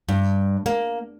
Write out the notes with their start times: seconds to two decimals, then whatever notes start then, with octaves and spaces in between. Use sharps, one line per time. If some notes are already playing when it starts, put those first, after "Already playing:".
0.08 G2
0.66 A#3